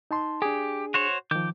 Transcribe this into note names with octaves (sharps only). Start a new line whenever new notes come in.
D#4 A5 C6
D4 G4 G#4
F#4 C5 C#5
D#3 F3 D6 G6